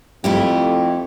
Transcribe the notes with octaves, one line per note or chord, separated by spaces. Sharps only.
F2 A3 E4 G4